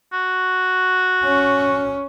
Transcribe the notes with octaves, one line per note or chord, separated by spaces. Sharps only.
F#4
C#4